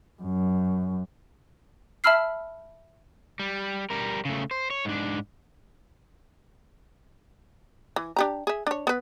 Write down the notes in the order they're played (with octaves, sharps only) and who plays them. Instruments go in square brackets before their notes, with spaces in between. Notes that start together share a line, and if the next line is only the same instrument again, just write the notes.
[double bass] F#2
[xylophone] E5 A5 B5 E6 F6 C7
[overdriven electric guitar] G3
G3 A#4
C#3 A3
C5
C#5
G#2 D4
[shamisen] E3
D4 G4 A#5
G#4 E5
D4 C#5
B3 B4